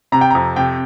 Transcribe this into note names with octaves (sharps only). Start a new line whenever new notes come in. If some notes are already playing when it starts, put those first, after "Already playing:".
C3 A#5
G5
F2 A#5
C3 G5